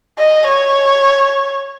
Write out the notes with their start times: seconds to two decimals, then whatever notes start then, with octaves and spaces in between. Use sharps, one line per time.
0.19 D#5
0.48 C#5